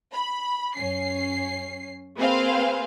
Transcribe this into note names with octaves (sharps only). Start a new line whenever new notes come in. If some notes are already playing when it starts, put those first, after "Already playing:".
B5
F#2 C#4 C7
A#3 C4 G#4 B4 C5 F5